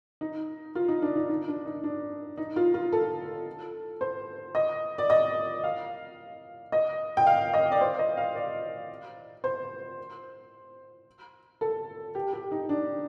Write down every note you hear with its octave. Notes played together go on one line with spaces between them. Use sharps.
D#4
F4
D#4
D4
D#4
D#4
D4
D#4
D4
D#4
F4
F4
A4
C5
D#5
D5
D#5
F5
D#5
G5
F5
D#5
D5
C5
D#5
F5
D5
C5
A4
G4
G4
D#4
D4